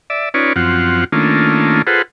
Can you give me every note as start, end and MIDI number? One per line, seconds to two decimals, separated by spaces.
0.10 0.29 74
0.10 0.29 76
0.34 0.53 61
0.34 0.53 63
0.34 0.53 65
0.34 0.53 71
0.34 0.53 73
0.34 0.53 74
0.56 1.04 42
0.56 1.04 53
0.56 1.04 60
0.56 1.04 65
0.56 1.04 78
1.12 1.82 51
1.12 1.82 57
1.12 1.82 58
1.12 1.82 61
1.12 1.82 62
1.12 1.82 65
1.87 2.02 65
1.87 2.02 68
1.87 2.02 69
1.87 2.02 71
1.87 2.02 72
1.87 2.02 78